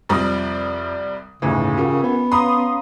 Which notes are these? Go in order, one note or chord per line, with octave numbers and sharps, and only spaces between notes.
C2 F2 G3 D5 D#6 A#6
G1 D#2 A2 C#3 E3
C#4 F4 G4 A#4 F#5
B3
C#4 B4 C#5 F5 A#5 C6 D#6